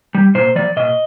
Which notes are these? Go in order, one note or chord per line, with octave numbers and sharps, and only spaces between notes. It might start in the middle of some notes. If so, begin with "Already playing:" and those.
G3
A#2 C5
F3 D5
A#2 D#5